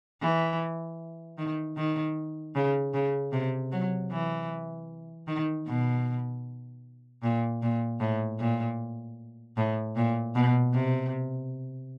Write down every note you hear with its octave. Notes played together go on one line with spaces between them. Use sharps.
E3
D#3
D#3
C#3
C#3
C3
F#3
E3
D#3
B2
A#2
A#2
A2
A#2
A2
A#2
B2
C3